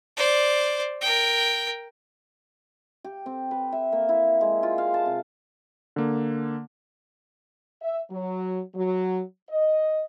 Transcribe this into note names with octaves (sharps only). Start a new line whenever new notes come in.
C5 D5
A#4 G5
G4
C4
B4
E5
A#3
E4
G#3
F4
F5
A5
C3
D3 A#3
E5
F#3
F#3
D#5